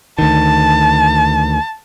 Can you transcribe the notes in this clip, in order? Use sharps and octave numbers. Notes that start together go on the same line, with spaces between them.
D2 D#3 A5